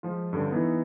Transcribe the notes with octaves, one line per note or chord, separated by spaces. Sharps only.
F3 G#3 F4
G2 D3 C#4
E3 B3 D#4